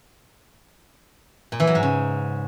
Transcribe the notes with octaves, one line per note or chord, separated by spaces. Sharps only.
A#2
E3
F#3
G#2
C#3